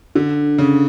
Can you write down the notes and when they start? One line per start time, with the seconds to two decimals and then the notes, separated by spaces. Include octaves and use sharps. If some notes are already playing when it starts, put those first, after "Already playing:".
0.15 D3
0.58 C#3